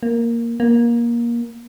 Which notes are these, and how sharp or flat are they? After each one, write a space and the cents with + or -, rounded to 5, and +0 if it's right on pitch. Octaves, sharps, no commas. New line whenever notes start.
A#3 +0
A#3 +20